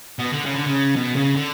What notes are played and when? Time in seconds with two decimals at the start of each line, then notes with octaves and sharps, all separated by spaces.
0.19 B2
0.32 D3
0.45 C#3
0.55 D3
0.66 C#3
0.96 B2
1.16 C#3
1.35 D3